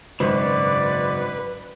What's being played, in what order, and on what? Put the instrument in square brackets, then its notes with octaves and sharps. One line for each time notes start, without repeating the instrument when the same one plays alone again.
[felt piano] G#1 C5 [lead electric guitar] F#2 C#3 [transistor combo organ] B4 [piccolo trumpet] D5